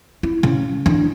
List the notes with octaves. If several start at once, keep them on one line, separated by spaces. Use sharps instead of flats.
E4
C#3
E3 D4